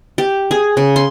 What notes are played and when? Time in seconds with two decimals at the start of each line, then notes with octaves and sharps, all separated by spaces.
0.18 G4
0.51 G#4
0.77 C#3
0.96 C6